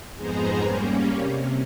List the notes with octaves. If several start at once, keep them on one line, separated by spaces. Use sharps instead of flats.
F2 G#2 B3 G#4 C5 A#5
G3 A#3 C#4
C3